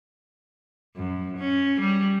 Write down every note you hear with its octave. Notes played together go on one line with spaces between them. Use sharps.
F#2
C#4
G3